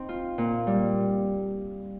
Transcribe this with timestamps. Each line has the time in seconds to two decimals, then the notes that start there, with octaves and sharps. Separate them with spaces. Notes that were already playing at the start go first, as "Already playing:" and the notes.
Already playing: C4 D#4
0.09 F4
0.38 A#2
0.67 G3